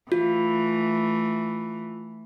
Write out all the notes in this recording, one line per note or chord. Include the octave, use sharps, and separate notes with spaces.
E3 A3 F4